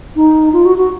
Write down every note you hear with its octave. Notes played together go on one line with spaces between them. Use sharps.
D#4
F4
F#4
F#4